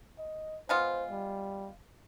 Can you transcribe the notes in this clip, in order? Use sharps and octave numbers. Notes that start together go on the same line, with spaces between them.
D#5
G#3 B3 F4 C5
G3